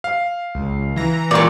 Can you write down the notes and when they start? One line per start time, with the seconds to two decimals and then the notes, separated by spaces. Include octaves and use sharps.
0.04 F5
0.55 C#2
0.96 E3 A#5
1.31 C#2 A#2 D5 C#6